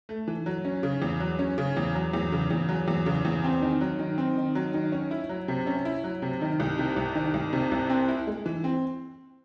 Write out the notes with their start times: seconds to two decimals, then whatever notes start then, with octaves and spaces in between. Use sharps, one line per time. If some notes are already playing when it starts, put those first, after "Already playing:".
0.09 A3
0.28 E3
0.46 F#3
0.65 C#4
0.83 C#3
1.02 E2
1.20 F#3
1.39 C#4
1.58 C#3
1.77 E2
1.95 F#3
2.14 E2
2.32 C#3
2.51 E2
2.69 F#3
2.88 E2
3.06 C#3
3.25 E2
3.44 C4
3.62 D#3
3.81 F#3
3.99 D#3
4.18 C4
4.36 D#3
4.55 F#3
4.74 D#3
4.92 C#4
5.11 E4
5.29 F#3
5.48 C3
5.67 C#4
5.85 E4
6.04 F#3
6.22 C3
6.41 D#3
6.60 C2
6.78 C3
6.96 C2
7.15 D#3
7.34 C2
7.53 C3
7.72 C2
7.90 C4
8.08 E4
8.27 G#3
8.46 E3
8.64 C4